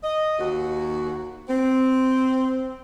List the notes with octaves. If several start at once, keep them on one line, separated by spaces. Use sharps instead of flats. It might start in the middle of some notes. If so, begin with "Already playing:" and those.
D#5
D#2 F#4
C4